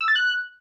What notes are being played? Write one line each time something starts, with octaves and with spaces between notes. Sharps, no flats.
E6
A6
F#6